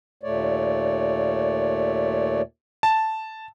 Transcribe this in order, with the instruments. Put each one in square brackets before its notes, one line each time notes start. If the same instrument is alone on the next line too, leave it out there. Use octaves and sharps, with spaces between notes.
[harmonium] D#2 A#2 A3 C#5 D5
[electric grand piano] A5